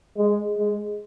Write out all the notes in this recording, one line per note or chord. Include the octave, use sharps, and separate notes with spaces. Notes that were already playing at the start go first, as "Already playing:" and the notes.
G#3
G#3